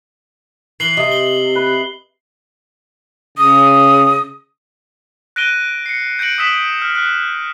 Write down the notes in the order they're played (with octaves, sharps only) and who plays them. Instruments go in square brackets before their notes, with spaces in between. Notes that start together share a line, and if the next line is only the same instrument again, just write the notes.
[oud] E3 [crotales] C7 F#7 G7
[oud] C3 [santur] D#5 E5
[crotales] G7
[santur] B4
[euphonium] C#3 [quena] D#6
[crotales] F#6 A#6 D7 D#7 G7
C7 C#7
G6 A#6 C#7 D7 F#7
D#6 E6 B6 E7 F#7
F6
F6 F#6